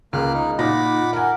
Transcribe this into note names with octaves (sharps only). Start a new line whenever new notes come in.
C#2 A#3 F6 F#6
D#4
A#2 D#4 F#5 B5 D6 A#6
A#4 F#5 G#5